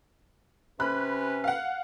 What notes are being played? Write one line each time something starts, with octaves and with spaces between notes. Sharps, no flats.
C3 C#4 B4 B5 F#6
F5 F#5